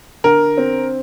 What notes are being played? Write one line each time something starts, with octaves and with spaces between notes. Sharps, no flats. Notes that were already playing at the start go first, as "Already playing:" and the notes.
D3 A#4
C4